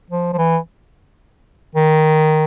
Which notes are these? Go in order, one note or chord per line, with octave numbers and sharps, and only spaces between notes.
F3
F3
E3
D#3